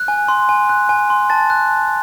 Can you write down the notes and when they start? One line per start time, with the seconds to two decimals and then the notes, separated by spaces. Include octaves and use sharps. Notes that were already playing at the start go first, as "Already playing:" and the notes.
Already playing: F#6
0.08 G#5
0.28 C6
0.49 G#5
0.69 F#6
0.89 G#5
1.10 C6
1.30 A5 A6
1.50 F#6
1.70 A5